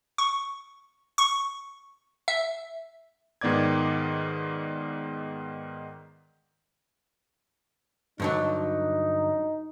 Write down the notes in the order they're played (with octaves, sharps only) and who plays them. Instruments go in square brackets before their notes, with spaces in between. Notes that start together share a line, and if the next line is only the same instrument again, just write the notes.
[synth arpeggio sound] C#6
C#6
E5
[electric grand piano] G#2 D#3 B3 D5 D6 G#6
[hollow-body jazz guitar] G2 D3 F#3 [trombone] D#4